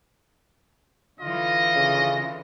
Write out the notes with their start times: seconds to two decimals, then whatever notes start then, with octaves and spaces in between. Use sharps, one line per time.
1.21 D3 E3 F4 D#5
1.76 C#3